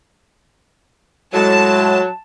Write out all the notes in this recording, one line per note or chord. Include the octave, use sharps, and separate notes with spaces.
A2 F#3 G#3 A5